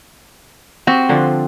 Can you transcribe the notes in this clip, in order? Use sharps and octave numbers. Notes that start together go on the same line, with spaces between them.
C4 F#4 G4
D3 F3 D4